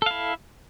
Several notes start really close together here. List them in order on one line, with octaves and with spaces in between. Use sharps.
A4 F5 E4